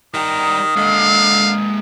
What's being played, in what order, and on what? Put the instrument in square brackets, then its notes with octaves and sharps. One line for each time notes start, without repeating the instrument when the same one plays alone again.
[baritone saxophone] D#3 [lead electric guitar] G3 A#5 [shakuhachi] D#6
[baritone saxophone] D3 [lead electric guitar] G#3 A#3 [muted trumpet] F5